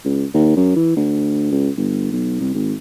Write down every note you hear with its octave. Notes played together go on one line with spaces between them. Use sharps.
C#2
D#2
F#2
E3
D2
C#2
G1
B1
C2
G#1